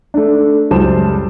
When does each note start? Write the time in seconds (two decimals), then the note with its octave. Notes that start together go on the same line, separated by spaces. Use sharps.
0.14 A3 D4
0.71 C#2 F#2 G3 C5 A5 E7